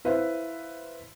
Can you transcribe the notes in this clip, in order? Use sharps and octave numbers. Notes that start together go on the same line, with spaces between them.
E4 B4 C5 E5 F5